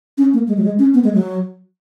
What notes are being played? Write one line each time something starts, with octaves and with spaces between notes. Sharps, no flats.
C#4
A#3
G#3
F#3
G#3
C#4
B3
G#3
F#3